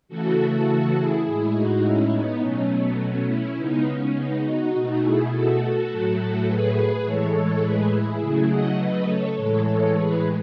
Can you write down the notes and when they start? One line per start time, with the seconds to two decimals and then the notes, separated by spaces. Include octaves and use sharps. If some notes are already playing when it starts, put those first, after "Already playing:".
0.08 C#3 E3 A3 F#4 A4
0.95 E4 G#4
1.24 A2 G#3 E4 G#4
1.53 D#4 F#4
1.82 C#4 E4
2.11 B3 D#4
2.40 B2 F#3 A3 C#4
2.70 B3
2.98 C#4
3.27 C#4 E4
3.56 C#3 G#3 B3 D#4
3.85 C#4
4.14 B3 D#4
4.43 D#4 F#4
4.73 B2 A3
5.01 E4 G#4
5.30 F#4 A4
5.59 F#4 A4
5.88 A2 F#3 A3
6.17 F#4 A4
6.46 G#4 B4
7.04 A2 E3 G#3 A4 C#5
7.33 A4 C#5
7.62 G#4 B4
7.91 E4 G#4
8.20 C#3 F#3 A3
8.49 D#5 F#5
8.78 B4 D#5
9.07 A4 C#5
9.36 A2 E3 G#3 A4 C#5
9.65 A4 C#5
9.94 G#4 B4